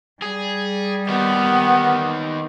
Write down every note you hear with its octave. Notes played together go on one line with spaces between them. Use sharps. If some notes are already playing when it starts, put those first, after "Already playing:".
G3 G#4
D#3 B3 G4